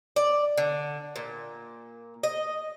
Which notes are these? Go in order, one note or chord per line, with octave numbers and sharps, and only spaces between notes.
D5
D3
A#2
D#5